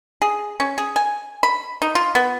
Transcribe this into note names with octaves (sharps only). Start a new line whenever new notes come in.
G#4
C#4
G#4
G#5
B5
D#4
F4
B3